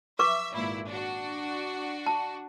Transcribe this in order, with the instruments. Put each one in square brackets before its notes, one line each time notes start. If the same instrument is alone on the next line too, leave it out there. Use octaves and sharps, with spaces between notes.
[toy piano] B4 C#6 D6 [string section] E5
[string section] G#1 A#2 E4
D4 F#4
[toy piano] A5